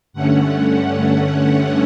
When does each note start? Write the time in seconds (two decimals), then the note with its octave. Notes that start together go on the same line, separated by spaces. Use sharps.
0.13 G2 D3 A3 C#4 F#5
1.37 F#5